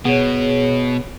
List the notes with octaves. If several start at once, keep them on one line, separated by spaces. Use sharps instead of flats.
B2 B3 G#4 C#5